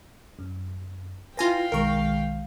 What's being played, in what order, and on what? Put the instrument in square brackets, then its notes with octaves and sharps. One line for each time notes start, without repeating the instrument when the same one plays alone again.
[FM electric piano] F#2
[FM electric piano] E4 B4 [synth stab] F4 G#5 A#6 [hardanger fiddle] F5 G5
[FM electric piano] B1 D#3 G#3 [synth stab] A#4 C#6